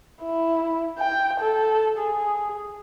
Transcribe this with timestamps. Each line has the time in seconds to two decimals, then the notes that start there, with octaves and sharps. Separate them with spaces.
0.22 E4
0.99 G5
1.40 A4
1.98 G#4